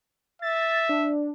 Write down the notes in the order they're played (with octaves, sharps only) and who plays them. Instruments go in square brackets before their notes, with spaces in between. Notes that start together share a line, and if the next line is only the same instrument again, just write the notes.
[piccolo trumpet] E5 [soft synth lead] A6
[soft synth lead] D4